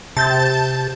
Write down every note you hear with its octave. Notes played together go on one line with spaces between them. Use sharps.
C3 A5 G6 A6